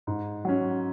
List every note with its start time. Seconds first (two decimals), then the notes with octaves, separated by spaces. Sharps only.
0.07 G#2
0.45 F#3 C#4